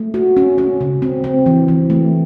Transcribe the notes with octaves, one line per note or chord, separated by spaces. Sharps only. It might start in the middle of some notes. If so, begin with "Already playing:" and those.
Already playing: A3
F#4
C#4
C#4
C#3
C4
C4
E3
E3
A3